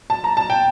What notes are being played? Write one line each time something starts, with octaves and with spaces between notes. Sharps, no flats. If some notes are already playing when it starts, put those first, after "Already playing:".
A5
A#5
A5
G5